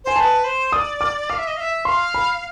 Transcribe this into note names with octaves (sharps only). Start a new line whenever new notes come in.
C5 G#5
B4 C5 A5
C5
D5 D#6
D6
F5 D6
E5
D#5
F5
E5
F5 C6
B5